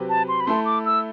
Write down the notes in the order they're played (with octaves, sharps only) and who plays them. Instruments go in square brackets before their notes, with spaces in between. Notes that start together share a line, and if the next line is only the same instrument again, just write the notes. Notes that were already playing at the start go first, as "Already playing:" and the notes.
Already playing: [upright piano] C3 F#3 C4 G4 B4
[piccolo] A5
C6
B5
[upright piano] A3 E4 A4 [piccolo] C6
[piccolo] D6
E6